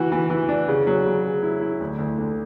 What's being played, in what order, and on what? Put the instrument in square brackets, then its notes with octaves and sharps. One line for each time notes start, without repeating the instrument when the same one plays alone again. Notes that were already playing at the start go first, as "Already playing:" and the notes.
Already playing: [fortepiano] E3 F#4
E3
E3
D4
C#3
F#3
C#3
C#3
E4
E4
D2
D2
D3